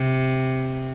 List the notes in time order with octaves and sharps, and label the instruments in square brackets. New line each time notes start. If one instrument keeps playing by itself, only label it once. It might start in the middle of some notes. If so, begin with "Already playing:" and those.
Already playing: [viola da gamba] C3